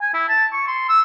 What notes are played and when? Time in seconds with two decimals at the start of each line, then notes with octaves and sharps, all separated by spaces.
0.02 G#5
0.14 E4
0.29 A5
0.53 C#6
0.68 C6
0.89 E6